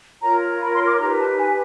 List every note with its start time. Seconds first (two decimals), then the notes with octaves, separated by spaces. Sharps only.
0.22 F4 A#4 C#5 A#5
0.61 B5
0.74 C6
0.86 D6
0.99 D#4 G4 B4 A#5
1.19 A5
1.38 G#5